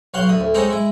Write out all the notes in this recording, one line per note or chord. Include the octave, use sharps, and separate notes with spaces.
B1 C#5 F5 F#5 C6
D2 D3 D#6
D2
G#3 C4 D#4 G#4 A4 C#5
G#3 E4